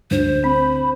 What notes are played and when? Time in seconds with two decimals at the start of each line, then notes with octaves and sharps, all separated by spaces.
0.11 D2 C5
0.44 C4 B5